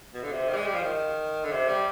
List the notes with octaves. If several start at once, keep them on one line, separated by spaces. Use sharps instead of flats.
B2
D3
C3
D#3
G3
G#3
G3
F3
D#3
D3
C3
G3